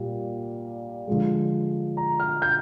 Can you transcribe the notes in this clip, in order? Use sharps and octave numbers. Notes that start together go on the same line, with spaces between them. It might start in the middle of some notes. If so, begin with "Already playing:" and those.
Already playing: A#2 G3
D3 F3 G#3
A#5
F6
G6